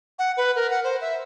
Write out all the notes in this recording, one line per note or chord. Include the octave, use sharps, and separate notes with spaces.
F#5
B4
A#4
F#5
C5
E5